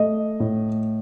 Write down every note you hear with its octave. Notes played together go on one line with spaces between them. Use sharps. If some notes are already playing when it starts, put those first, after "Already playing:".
Already playing: A3 D#5
A2